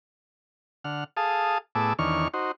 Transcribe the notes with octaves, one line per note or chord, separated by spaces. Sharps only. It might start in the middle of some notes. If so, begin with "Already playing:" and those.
D3 F#5 F6
G#4 A4 F5 A5 D#6
A2 B3 G#4 A5 D6 E6
E2 D#3 D4 C#5 C#6 F6
D#4 F#4 C5